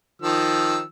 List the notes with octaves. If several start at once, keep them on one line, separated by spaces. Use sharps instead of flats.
D#3 F3 E6